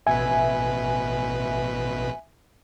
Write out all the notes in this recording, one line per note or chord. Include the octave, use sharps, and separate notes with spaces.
A1 B2 B4 E5 G#5